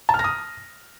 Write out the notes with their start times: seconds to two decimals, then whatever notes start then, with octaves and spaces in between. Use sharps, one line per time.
0.09 A5
0.14 F6
0.19 A#6
0.24 D#6